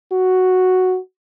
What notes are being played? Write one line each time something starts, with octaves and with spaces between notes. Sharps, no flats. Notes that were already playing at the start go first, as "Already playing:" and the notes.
F#4